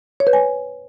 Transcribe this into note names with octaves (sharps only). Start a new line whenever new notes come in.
C#5
B4
G#5